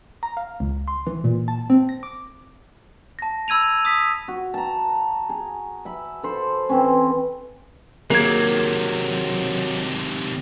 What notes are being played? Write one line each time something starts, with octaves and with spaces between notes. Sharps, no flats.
A#5
F5
C#2
C6
E3
A#2
A5
C4
A#6
D6
A5 A#6
B5 E6 G#6 D#7 F7
D#6 B6
F#4
A5 A#5
G#4
E5 B5
A4 C5 B5
E3 C4 C#4
C3 D#3 F#3 A#3 G#4 G#6